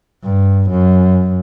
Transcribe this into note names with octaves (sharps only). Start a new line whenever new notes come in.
G2
F#2